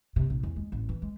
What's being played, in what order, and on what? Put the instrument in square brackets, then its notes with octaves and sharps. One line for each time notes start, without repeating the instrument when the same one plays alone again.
[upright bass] C3
A#1
E2
G#3
A1
E3
G#3